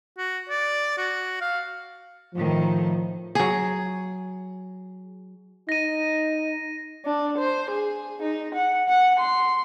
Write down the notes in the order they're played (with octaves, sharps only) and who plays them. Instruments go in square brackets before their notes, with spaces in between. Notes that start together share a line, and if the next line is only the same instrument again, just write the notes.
[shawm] F#4
D5
F#4
F5
[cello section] A2 D#3 [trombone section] F3
[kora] F#3 G#4
[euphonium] D#4 [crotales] A#6 D#7
[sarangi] D4
C5
G#4
D#4
F#5
F#5
C6